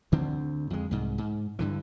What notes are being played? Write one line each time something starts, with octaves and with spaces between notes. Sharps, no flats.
D2 D3 C4
F2 G#3
C2 G#2
G#2
G2 D3 E3